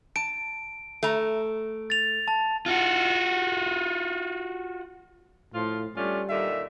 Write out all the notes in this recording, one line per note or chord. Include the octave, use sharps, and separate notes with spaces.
A5 D7
A3 A#5
A6 F7
A5
F4 F#4
A2 F3 F4
G3 A3 C#4 D4 F4
A#2 D3 D#3 E5